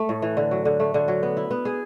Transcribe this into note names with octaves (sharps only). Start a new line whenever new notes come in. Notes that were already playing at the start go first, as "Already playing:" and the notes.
Already playing: A3
A2
E3
D3
F#3
D3
A3
D3
F#3
B3
E4
B3
G#4